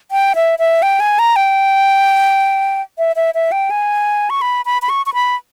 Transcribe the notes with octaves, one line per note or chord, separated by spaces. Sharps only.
G5
E5
E5
G5
G#5
A#5
G5
E5
E5
E5
G5
G#5
C#6
B5
B5
B5
C#6
C#6
B5